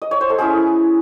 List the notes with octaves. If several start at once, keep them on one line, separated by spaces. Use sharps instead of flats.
D#5
C#5
C5
A4
G#3 C#4 E4 G#4